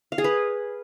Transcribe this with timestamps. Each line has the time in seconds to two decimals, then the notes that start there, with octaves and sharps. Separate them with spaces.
0.12 F5
0.18 G#4
0.24 B4